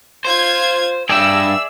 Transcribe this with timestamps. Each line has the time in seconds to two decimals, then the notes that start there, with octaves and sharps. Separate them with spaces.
0.25 F4 C5 C6 G#6
1.09 G2 G#4 D5 E5 G5 E6